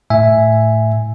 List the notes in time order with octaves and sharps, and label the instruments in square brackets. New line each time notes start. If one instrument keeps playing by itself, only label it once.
[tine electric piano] A2 E5 G#5